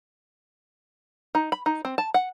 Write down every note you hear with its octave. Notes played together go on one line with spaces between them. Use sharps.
D#4
B5
D#4
C4
A5
F#5